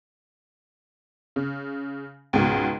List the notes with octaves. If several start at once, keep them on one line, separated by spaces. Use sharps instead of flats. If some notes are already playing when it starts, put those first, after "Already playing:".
C#3
C#2 G#2 B2